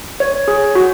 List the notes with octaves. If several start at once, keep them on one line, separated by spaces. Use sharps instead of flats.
C#5
G#4
F#4